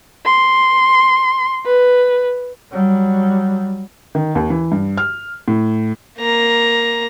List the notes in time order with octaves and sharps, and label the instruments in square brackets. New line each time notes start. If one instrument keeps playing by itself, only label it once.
[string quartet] C6
B4
[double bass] F#3 G3
[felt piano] D#3
D#2
E3
G2
F6
A2
[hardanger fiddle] A#3 A#5